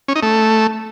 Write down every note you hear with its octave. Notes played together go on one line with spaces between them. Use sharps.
C#4
D#4
A3